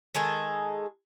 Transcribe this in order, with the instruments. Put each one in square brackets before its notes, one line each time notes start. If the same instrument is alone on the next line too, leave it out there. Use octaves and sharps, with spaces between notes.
[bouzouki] D#3 G#3 G#4 A4